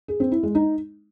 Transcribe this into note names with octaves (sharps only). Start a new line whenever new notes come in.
G#4
C4
E4
G#3
D#4